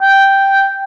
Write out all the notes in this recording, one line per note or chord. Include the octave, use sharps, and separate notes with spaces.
G5